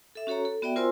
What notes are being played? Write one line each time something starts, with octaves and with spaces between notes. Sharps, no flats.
A4 E5
C#4 F#4 A4 C#5 A#5
A4
B3 F#4 D5 E5 G5
F4 A#4 C5 G#5 C6 E6